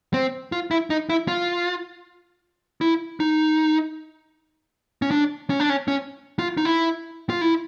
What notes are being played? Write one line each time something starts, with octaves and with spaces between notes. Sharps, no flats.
C4
F4
E4
D#4
E4
F4
E4
D#4
C#4
D4
C#4
D4
C#4
C#4
F4
D#4
E4
F4
E4